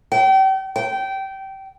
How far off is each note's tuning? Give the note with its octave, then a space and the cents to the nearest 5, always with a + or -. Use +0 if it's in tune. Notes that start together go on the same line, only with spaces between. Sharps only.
G5 -35
G5 -20